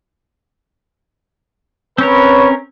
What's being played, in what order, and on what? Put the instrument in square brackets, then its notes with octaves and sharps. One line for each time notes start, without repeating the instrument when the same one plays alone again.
[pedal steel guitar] C4 C#4 A#4 [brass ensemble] B4 C#5